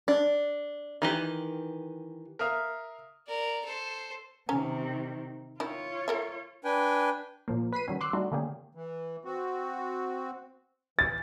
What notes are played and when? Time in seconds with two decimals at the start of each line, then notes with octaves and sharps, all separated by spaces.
0.08 D4
1.02 D#3 E3 G4
2.39 A#4 E5 F5 D#6 F6
3.27 A#4 D5
3.65 A4 C5
4.49 C3 D#3 C#4 A#5
5.60 D#3 E4 F4 C#5
6.08 A4 A#4 E5
6.64 D4 B4 G5 G#5
7.48 A#2 F3 A#3
7.72 B4 B6 C7 D#7
7.88 D#3 F#3 G3 C#4
8.01 C6 D6 E6 F#6
8.13 G3 A3 D4 D#4 F#4
8.32 D3 A3 A#3 C#4 G4 G#4
8.75 E3
9.25 C4 F#4
10.99 E3 A6